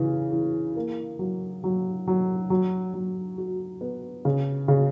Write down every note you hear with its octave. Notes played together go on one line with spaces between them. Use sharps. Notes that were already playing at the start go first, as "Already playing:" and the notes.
Already playing: C#3 E3
E3
A#3
F#3
F#3
F#3
F#3
F#3
F#4
B3
C#3
C#3